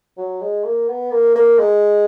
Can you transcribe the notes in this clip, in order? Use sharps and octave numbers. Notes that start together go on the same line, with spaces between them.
F#3
G#3
A#3
B3
A#3
A#3
G#3